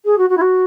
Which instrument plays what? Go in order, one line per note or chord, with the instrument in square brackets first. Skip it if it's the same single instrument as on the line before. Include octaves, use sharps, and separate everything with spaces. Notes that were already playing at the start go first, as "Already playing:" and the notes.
[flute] G#4
F#4
F#4
E4
F#4